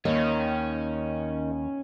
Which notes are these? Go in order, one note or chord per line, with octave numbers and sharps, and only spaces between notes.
D#2 D#3 C#4